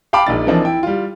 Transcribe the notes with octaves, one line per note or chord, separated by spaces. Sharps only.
F5 G5 A5 B5 D6
A#1 A#2 D#4 A6
E3 F3 A#3 C4 D4 D#4
E4 G5
G3 F4